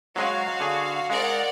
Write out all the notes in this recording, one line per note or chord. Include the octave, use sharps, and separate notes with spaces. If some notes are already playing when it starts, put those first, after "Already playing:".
F#3 G#3 F#4 G#4 F5
D3 G#4
G#3 A#4 D5 F#5